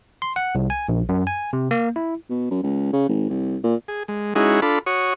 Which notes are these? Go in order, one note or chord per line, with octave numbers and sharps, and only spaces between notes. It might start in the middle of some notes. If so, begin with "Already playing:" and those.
C6
F#5
C2
G#5
A#1
F#2
G#5
C3
A#3
E4
B2
F#2
C#2
C#3
G#1
C2
A#2
G#4
G#3
G#3 C#4 D#4 E4 F#4 G#4
D4 F4 A4 B5
F#4 C#5 C#6 D#6